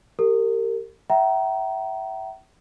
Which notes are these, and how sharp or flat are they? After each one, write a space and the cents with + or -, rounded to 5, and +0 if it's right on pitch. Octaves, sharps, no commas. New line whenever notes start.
G4 +0 A#4 -30
E5 +5 G5 -40 A#5 +15